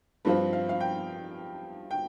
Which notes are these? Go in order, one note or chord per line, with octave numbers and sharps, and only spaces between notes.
G2 F3 C4 F4 B4
F5
F5
G5
G5